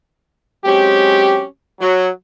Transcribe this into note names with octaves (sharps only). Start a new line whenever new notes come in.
F#3 G#3 C4 C#4 G4
F#3